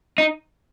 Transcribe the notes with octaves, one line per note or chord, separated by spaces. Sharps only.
D#4